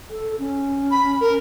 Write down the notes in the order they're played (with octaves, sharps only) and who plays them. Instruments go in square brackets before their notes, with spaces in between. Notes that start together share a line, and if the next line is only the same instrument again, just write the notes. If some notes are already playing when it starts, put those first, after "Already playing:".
[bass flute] A4
C#4
[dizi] B5
A#4